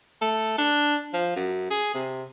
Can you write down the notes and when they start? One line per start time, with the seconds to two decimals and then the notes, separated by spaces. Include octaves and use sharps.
0.21 A3
0.58 D4
1.13 F3
1.36 F#2
1.70 G#4
1.94 C3